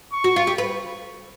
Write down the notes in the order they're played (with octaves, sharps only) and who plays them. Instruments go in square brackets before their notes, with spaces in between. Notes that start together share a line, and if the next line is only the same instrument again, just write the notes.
[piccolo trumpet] C#6
[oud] F#4
F4
G4
B4